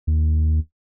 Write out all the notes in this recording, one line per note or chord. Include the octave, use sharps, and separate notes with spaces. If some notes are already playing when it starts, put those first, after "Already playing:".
D#2